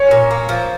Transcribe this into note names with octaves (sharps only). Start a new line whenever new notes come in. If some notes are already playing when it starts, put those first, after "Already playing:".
Already playing: C#4 C#5
A#2
A#3
F3